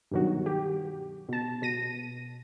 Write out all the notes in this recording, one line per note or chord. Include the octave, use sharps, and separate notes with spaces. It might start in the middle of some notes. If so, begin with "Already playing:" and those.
G2 B2 D#3 F#3 F#4
G4
B2 A5
B2 A#6 D#7